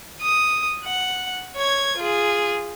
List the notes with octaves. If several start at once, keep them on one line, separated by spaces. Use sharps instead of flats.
D#6
F#5
C#5 G#6
F4 G#4